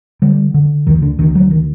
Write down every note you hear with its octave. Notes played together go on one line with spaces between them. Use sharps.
D3 G3
D3
D2 D#3
D3
D2 D#3
F#3
D#3